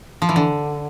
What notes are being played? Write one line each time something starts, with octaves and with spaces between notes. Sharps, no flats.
F3
E3
D3